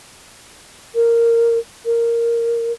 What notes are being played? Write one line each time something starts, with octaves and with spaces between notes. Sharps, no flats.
A#4
A#4